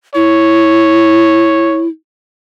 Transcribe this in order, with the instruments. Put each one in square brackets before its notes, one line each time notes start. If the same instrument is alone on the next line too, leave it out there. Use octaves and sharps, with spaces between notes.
[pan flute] E4 [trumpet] C#5